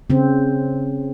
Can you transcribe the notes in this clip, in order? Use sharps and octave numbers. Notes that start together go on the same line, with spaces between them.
C#3 C4